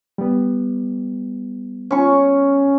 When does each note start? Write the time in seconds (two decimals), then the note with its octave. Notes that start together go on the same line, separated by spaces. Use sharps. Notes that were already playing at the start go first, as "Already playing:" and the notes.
0.18 G3 B3
1.91 C#4 C#6